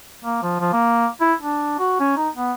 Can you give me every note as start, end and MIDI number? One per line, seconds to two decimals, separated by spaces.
0.25 0.38 58
0.43 0.58 53
0.60 0.72 53
0.73 1.07 58
1.21 1.34 64
1.41 1.75 62
1.79 1.99 66
2.00 2.14 61
2.17 2.29 63
2.35 2.52 59